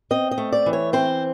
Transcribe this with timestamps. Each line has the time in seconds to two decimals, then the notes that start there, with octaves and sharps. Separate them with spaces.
0.11 C4 D#5
0.31 D#5
0.38 A3
0.52 D5
0.66 E3
0.73 C#5
0.93 C4 C5